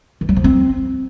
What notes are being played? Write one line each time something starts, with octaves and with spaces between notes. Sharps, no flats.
D#3
F#3
F3
C4